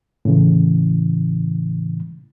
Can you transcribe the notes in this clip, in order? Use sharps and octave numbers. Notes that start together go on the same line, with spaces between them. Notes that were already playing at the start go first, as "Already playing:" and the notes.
A2 C#3 E3